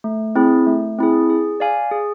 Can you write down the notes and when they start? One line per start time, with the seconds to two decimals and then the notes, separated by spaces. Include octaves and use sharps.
0.04 A3
0.36 C4 E4 G#4
0.67 A3
0.99 C4 E4 G#4
1.30 G#4
1.60 D5 F5 G#5
1.91 G#4